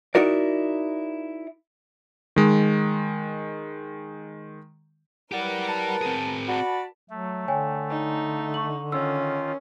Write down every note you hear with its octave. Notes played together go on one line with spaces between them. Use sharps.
D#4 E4 F#4 A#4 D5
D#3 G#3
F#3 E4 G4 A#4 B4 D5 F#5
A5
C4 G#4
F#4 D5 A5 B5
F#3 A3
D3 C#5 G5 G#5
D#4
C#6 F#7
D#3 C#4 F4 E6